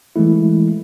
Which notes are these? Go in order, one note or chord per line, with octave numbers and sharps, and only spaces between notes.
E3 G#3 A3 E4